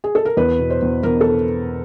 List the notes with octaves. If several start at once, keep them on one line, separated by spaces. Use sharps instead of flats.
G#4
A4
A#4
E2 B4
B2
C5
E2
E2 A#4
A4